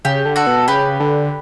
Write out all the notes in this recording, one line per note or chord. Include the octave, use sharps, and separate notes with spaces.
C#3 G4
D3
F#4 A4
B2
C#3 G4 B4
D3